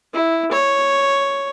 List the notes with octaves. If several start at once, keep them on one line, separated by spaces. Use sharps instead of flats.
E4
C#5